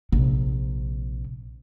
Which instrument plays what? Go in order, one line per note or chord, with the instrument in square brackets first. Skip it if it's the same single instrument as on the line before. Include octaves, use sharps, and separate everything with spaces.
[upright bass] A#1 C3